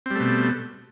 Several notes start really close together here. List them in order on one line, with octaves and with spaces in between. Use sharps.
C4 G3 A3 B2